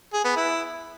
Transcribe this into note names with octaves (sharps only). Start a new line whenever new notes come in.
G#4
B3
E4